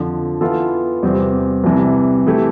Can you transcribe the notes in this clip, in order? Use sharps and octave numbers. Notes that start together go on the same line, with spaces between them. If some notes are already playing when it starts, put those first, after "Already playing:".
Already playing: F2 D3 F3
E3 B3 F4 A4
E2 C3 G3 C4
C2 C3 E3 G3
E3 A3 E4 G4